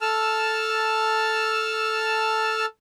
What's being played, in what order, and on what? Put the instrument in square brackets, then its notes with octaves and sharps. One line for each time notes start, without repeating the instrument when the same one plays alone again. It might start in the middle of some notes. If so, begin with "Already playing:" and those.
[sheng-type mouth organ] A4 A5 E6 F6